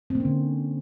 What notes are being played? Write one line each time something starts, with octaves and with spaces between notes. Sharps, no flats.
D3 A#3 C4 C#4